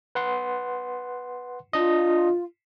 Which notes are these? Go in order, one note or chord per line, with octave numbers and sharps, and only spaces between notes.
B4 F#5 C6
D4 F4 D#5